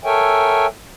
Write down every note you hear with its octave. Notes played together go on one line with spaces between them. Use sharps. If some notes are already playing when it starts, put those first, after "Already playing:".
A4 A#4 C#5 E5 G5 G#5